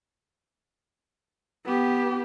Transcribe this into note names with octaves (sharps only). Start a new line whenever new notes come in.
B3 G4